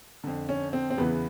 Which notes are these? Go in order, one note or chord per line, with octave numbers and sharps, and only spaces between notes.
F2 D3
C#4
C4
C4
E2 C#3 E3 B3